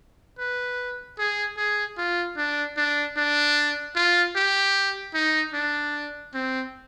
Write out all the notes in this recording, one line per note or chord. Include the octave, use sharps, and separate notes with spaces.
B4
G#4
G#4
F4
D4
D4
D4
F4
G4
D#4
D4
C4